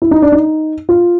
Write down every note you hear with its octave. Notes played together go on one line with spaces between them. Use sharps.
E4
D#4
D4
D#4
F4